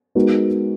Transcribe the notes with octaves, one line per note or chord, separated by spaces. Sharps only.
G#3 B3 D#4 F#4 A#4